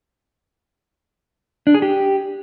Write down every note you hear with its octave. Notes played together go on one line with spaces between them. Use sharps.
D4
G#4
G4